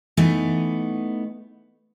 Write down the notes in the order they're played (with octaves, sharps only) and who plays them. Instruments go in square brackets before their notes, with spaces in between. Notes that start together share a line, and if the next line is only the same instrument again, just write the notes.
[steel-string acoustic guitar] E3 A3 B3 D#4